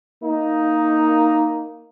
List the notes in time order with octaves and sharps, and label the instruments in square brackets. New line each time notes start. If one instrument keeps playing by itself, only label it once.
[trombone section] A#3 D#4